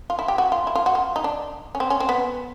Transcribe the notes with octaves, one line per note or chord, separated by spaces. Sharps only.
F4
E4
G4
F#4
F4
E4
F4
F#4
F4
D#4
D4
C#4
C4
C#4
C4
B3